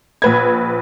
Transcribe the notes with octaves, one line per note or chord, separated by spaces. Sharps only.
A#1 B4 G#6